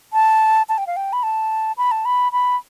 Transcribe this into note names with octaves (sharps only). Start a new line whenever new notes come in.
A5
A5
G5
F5
G5
B5
A5
B5
A5
B5
B5